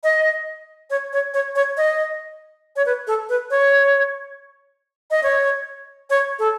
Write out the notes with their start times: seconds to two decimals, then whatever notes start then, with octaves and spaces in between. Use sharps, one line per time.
0.04 D#5
0.90 C#5
1.13 C#5
1.34 C#5
1.56 C#5
1.77 D#5
2.76 C#5
2.86 B4
3.07 A4
3.29 B4
3.50 C#5
5.11 D#5
5.23 C#5
6.10 C#5
6.39 A4